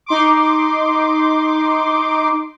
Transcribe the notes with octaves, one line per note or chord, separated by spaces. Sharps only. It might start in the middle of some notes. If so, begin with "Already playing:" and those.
D#4 C6 D6